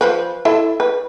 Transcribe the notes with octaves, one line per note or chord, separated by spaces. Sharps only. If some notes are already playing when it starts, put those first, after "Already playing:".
F3 B4
E4 A4 E5
B4